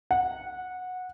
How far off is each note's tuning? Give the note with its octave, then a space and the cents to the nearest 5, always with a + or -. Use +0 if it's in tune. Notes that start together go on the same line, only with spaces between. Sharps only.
F#5 -15